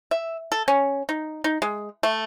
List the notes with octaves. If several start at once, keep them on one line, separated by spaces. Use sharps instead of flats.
E5
A4
C#4
D#4
D#4
G#3
A3